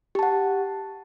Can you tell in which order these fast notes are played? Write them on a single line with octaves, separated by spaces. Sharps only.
G4 A5 F#5